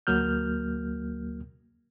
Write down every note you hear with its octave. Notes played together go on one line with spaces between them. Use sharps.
D2 F#3 A#3 F6 G6